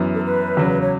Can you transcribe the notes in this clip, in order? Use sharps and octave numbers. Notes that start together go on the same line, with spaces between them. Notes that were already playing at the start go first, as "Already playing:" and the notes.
Already playing: F#2 E3 B3
A4
B4
E2 C#3 F#3
C#5